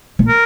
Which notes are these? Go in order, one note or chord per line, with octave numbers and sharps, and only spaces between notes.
A#2
A#4